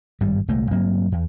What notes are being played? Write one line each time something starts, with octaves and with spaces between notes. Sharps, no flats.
G#1 G2 G3
D#1 C2 G#3 A3
G2 F#3 A#3 C4
E2